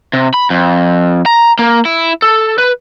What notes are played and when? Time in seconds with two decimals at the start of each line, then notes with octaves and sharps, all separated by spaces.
0.13 C3
0.34 B5
0.50 F2
1.26 A#5
1.59 A#3
1.85 E4
2.22 A4
2.58 B4